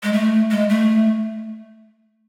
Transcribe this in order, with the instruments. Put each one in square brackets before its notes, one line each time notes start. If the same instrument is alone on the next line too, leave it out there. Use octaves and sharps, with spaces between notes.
[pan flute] G#3
A3
G#3
A3